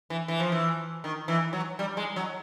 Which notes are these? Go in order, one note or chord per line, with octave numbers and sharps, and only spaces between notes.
E3
E3
F3
E3
D#3
E3
F#3
G3
G#3
F#3